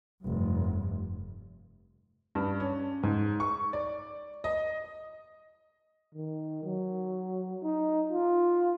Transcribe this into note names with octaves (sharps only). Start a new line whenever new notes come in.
F1 G2
G2
C#4
G#2
C#6
D5
D#5
D#3
F#3
D#4
F4